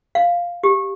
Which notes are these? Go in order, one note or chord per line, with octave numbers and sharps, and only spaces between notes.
F5
G4